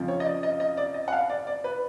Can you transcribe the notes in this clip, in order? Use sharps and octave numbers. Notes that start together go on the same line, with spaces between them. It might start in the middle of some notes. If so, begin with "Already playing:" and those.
Already playing: F2 C#3 F3
C#5
D#5
D5
D#5
D#5
D5
D#5
F#5
F5
D5
D5
B4